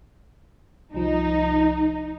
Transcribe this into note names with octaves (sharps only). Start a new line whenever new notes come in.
C2 F3 D#4